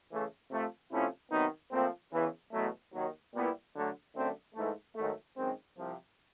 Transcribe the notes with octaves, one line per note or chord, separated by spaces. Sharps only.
C#3 E3 A3
C3 F3 A3
C3 F3 A3 C#4 E4
C3 D#3 F#3 B3 D#4
A#2 F3 A3 C4
E2 C#3 E3
E2 B2 F#3 A3
D#2 D#3 F#3
A#2 G3 B3 E4
D3 F#3 A3
F#2 D3 F#3 A3 C4
G#2 E3 A3
G#2 D#3 F#3 A3
F#2 D#3 G#3 C4
C2 C3 F3